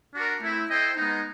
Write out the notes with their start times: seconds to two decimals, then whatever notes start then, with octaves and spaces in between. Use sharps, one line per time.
0.12 D4 F#4 A#4
0.40 A3 C4 E4
0.68 E4 A4 C5 D#5 G5
0.97 G#3 B3 D#4